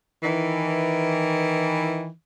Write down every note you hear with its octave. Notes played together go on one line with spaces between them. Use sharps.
D#3 E3